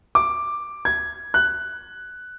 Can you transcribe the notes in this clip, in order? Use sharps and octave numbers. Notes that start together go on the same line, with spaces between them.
D6
G#6
F#6